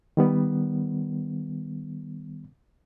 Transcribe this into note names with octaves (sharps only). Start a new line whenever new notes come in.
D#3 G3 B3